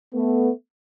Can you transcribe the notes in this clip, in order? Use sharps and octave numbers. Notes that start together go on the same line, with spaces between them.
A3 B3